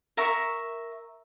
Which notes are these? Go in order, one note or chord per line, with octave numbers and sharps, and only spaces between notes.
A#4 E5 C#6